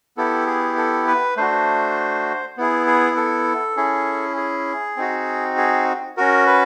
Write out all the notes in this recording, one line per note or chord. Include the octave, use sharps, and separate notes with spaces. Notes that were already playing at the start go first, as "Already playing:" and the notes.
B3 E4 G4 A4
G#4
A4
B4
A3 D4 F#4 C5
B3 E4 G#4
G#4
A4
C#4 E4 G#4
G#4
C4 D#4 F#4
G#4
C#4 F#4 A#4
B4